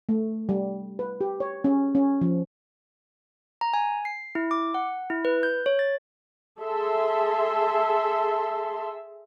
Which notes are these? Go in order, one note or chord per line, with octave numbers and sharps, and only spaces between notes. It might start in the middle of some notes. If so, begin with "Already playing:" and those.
A3
G3
B4
G4
C#5
C#4
C#4
F3
A#5
G#5
C7
E4
D6
F#5
E4
B4
G6
C#5
A6
G#4 A4 E5 C6